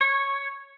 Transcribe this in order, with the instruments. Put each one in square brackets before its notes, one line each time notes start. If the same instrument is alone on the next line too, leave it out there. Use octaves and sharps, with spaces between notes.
[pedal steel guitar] C#5